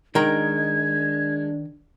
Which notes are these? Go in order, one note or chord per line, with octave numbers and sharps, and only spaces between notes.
D#3 G#3 D4 A#4 G#6